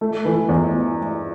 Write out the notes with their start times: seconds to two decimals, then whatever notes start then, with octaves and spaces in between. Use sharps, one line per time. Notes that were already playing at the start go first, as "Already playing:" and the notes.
0.01 A3
0.25 E3
0.49 E2